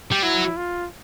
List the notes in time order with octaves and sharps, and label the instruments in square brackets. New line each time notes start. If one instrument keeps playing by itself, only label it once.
[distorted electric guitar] G3
[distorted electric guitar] F#3 [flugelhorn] E4
[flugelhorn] F4